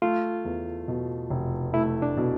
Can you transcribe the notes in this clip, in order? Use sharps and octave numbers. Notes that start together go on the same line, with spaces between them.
A3 F4
E2
B2
F1
A3 E4
D4
B2